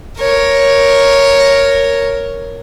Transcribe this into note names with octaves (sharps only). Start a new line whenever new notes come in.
A#4 C#5